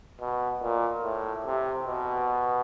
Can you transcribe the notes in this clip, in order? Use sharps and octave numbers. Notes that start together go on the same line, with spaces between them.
B2
A#2
A2
C3
B2